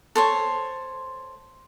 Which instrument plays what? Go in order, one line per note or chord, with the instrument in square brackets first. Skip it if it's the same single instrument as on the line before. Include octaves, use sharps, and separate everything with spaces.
[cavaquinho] A4 C5 C#5